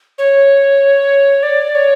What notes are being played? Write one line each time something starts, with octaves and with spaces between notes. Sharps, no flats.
C#5
D5
C#5